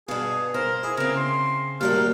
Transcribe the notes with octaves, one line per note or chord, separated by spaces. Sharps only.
G2 B2 G#4 F5
A#4 C5
E4 G#4
C#3 C4 A#4
C6
D#2 A2 F#3 G3 G4 A#4 F5